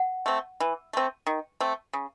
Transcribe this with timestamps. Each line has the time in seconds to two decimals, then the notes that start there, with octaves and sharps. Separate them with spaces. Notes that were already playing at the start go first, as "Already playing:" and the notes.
Already playing: F#5
0.26 A3 C4
0.60 E3
0.93 A3 C4
1.27 D#3
1.60 A3 C4
1.93 C#3